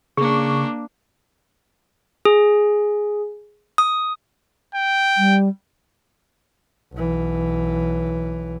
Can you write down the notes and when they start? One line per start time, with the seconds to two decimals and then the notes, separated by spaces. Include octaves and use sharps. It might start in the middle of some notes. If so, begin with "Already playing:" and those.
0.17 C#3 A#3 D4 G#4 C#6
2.25 G#4
3.78 D#6
4.75 G5
5.17 G3
6.93 B1 E3